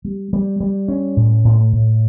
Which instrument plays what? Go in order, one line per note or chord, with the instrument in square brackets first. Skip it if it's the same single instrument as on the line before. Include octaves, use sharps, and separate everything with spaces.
[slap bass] G3
G3
G3
C#4
A2
A2
A2